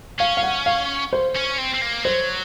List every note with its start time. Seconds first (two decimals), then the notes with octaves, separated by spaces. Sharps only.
0.19 C#4 F5
0.37 F5
0.43 F#5
0.66 F5
1.13 C5
1.36 C#4
1.58 C4
1.75 C4
1.82 A#3
2.05 F#3 C5